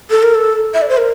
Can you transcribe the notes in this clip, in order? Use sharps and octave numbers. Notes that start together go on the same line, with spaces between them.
A4
A#4
A4
E5
D5
C5
A#4